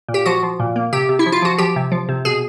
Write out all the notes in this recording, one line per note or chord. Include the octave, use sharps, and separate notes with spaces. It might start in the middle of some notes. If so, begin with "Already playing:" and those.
A#2
G4
F3 F#4
F3
A#2
A#3
C3 G4
C3
E4
F3
F4
F3 F#4
F3 G4
C3
F3
C3
B2 G#4